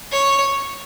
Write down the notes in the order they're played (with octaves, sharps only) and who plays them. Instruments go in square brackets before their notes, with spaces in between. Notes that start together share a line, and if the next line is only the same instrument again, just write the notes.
[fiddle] C#5